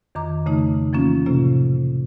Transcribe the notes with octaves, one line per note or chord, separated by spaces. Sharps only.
F2 D#3 A#5 D6
C#3 A3 D#4
E3 F3 A#3 C#4 F4
A2 C3 F3 A#3 C#4 F4